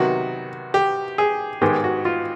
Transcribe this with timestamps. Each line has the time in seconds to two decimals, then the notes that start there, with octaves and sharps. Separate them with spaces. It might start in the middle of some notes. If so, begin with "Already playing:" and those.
Already playing: C3 D#3 F#3 B3 F#4
0.74 G4
1.18 G#4
1.61 G#2 D#3 G#3 B3 G4
1.84 F#4
2.05 F4